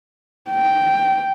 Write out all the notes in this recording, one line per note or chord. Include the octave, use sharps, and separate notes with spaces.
G5